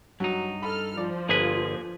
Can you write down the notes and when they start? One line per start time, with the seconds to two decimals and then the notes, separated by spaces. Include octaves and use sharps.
0.20 G2 F#3 D#4
0.63 A4 B5 F6
0.97 F3 D5
1.29 G1 A#3 G#4 B4